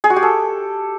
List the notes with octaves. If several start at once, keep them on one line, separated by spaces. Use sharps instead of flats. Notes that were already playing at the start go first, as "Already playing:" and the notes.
G#4
F#4
G4
A4